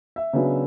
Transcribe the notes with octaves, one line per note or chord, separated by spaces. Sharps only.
E5
C#3 F#3 B3 D4